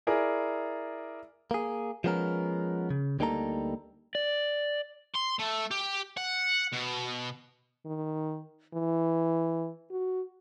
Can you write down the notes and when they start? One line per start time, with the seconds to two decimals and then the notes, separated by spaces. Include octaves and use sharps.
0.07 E4 G#4 A#4 D5
1.51 A#3 G#4
2.04 F3 G#3 B3 C#4 A#4
2.90 C#3
3.19 D2 G3 A#3 D#4 A4 A#5
4.15 D5
5.15 C6
5.40 A3
5.71 G4
6.17 F#5
6.73 B2
7.86 D#3
8.74 E3
9.91 F#4